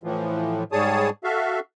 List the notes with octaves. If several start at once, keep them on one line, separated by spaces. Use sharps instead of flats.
A2 E3 F3
G#2 G3 G#4 C#5 A5 D#6
F#4 A4 E5 F5